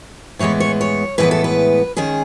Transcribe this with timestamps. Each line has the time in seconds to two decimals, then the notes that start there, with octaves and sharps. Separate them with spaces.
0.39 A2 E3 G#3 B3 C#5
0.60 C#5
0.81 C#5
1.18 A2 E3 G#3 B3 B4
1.31 A4
1.44 B4
1.97 D#3 G#3 C#4 G#4